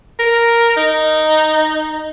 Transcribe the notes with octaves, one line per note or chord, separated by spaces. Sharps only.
A#4
D#4